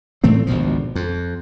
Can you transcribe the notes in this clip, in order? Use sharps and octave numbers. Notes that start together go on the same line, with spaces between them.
A2 E3 A3 C4
G#1 D2 B2 F3
F2